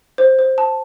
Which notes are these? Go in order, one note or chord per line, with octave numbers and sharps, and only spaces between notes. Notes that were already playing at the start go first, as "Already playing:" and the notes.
C5
C5
A5